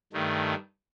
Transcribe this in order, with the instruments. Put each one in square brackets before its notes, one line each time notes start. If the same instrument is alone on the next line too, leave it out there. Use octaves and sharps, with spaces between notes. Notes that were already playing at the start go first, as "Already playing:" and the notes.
[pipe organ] G2 D#3 A3